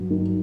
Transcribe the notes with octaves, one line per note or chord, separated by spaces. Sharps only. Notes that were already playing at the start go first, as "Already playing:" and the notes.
Already playing: G2 F#3
D#3